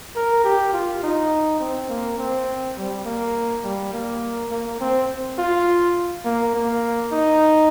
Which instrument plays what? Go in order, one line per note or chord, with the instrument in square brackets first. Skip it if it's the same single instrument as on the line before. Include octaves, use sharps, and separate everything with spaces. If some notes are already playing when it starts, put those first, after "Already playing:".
[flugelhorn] A#4
G4
F4
D#4
C4
A#3
C4
G3
A#3
G3
A#3
A#3
C4
F4
A#3
A#3
D#4